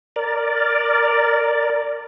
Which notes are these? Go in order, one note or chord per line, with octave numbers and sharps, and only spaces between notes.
A#4 D5